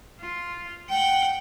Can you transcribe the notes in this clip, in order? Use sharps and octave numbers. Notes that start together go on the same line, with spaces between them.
F4
F#5 G5